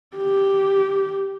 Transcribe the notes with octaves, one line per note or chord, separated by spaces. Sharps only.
G4